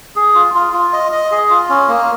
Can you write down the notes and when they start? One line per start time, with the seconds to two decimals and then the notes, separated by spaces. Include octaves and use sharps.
0.16 G#4
0.35 F4
0.55 F4
0.73 F4
0.93 D#5
1.12 D#5
1.31 G#4
1.50 F4
1.69 C#4
1.88 A#3